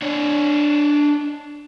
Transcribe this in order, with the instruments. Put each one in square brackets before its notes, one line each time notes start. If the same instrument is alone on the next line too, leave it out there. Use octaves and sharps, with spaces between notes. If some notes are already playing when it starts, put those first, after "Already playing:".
[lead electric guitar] D4 C#5